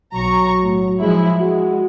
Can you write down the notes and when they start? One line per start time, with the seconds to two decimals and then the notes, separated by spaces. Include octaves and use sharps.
0.15 B1 F#3 A#5 C#6
0.61 A2
1.00 F3 G#3 E4
1.41 G#3 F#4